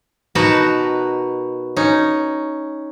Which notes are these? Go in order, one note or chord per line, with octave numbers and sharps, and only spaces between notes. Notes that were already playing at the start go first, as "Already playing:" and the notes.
B2 D#4 F#4 A#4 B4 A5
C#4 D#4